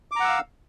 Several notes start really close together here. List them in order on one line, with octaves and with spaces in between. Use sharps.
D6 A#5 F#5 E6 F5